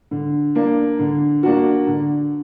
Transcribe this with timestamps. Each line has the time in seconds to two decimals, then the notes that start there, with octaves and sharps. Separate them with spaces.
0.11 D3
0.55 A#3 D4
0.99 D3
1.43 A#3 D4 F#4
1.87 D3